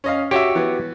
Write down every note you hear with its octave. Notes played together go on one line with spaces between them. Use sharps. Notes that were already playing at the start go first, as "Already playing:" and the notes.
C#4 D#5 F5
F#4 G4 C#5 E5
E3 B3